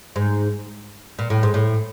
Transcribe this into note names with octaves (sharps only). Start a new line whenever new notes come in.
G#2
A#2
A2
G#2
A2